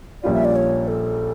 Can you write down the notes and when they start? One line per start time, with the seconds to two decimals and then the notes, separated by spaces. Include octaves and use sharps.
0.23 A#1 A#2 G3 C#4 F4 D5
0.34 E5
0.45 D5
0.56 C#5
0.88 A4